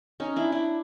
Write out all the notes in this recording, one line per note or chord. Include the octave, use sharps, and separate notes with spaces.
C#4 D#4
D4 E4
D4 E4